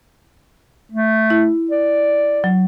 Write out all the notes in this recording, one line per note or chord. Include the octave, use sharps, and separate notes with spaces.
A3
E4
D5
F#3